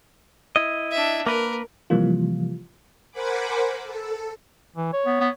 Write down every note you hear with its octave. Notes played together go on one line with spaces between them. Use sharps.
E4 D#5
D4 E5
A#3 A#4 B4
C3 E3 F3 G3 A#3 F4
A#4 C5 F#5 G#5 B5 D6
A4
E3
C#5
B3
B3